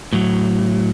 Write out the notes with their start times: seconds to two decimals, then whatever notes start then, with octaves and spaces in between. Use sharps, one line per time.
0.13 A2 F#3